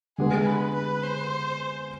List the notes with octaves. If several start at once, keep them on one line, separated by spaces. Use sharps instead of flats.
D3 G#3 B3 G#4
B4
B4
C5